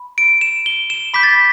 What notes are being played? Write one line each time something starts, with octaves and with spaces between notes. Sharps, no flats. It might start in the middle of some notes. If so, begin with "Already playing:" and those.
Already playing: B5
D7
E7
G7
E7
B5 D6 G6 B6
A6
B6